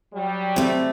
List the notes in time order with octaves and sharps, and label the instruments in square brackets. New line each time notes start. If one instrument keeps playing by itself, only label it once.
[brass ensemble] F#3 G3
[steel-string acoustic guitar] C3 A3